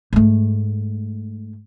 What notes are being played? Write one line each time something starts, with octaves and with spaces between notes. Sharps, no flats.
G#2 A3